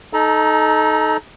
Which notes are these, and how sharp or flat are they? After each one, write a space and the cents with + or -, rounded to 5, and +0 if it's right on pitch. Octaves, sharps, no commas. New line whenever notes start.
D#4 +0 A4 -20 A#5 +25